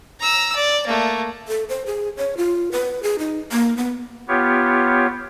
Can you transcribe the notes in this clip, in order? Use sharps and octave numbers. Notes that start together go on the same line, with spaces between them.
A#5 E6
D5
A3 A#3
A4
C5
G#4
C#5
F4
B4
G#4
D#4
A#3
B3
B3 F4 G4 C#5